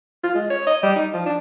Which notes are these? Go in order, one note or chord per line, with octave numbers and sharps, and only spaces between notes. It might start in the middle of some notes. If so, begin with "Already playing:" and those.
F4
G#3
C#5
D#5
G3
D#4
F3
D4